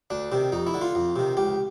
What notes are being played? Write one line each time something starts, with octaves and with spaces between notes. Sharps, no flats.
D2 D4
C3 D#3
F2 D#4
E4
D3
F4
F2
C3 D#3
C#2 G4